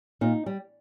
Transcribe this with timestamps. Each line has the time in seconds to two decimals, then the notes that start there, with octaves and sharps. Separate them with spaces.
0.21 A#2 D#4
0.46 G3